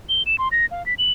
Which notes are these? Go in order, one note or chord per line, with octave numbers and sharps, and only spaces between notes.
G7
E7
C6
A#6
F5
B6
F#7